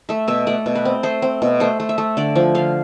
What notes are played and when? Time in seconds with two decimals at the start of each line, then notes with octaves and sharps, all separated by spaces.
0.09 A3 E5
0.28 B2 E5
0.47 A3 D5
0.66 B2
0.75 B4
0.85 C4
1.03 A3 C5
1.22 C4
1.42 B2
1.60 A3 C5
1.80 A3
1.89 E5
1.98 A3
2.17 D3 D5
2.36 F3
2.55 D3 F5